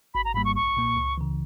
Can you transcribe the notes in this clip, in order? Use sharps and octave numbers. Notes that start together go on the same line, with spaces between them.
G#1 B5
A#5
G#2 G3 A#3 B5
C#6
B1 C#6
A#2 A#3
C#2
C#3 E3